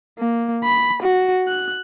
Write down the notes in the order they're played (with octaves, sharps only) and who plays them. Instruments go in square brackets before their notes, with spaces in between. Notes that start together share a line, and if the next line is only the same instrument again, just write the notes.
[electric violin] A#3
B5
F#4
F#6